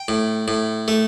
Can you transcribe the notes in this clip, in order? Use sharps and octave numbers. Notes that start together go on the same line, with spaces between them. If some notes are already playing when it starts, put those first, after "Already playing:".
Already playing: G5
A2
A2
A3